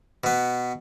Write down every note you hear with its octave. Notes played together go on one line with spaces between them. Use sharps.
B2 B3